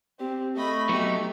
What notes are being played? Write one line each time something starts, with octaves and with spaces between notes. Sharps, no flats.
C4 G4
A3 D#5 B5 C#6
F#3 B3 D#4 G4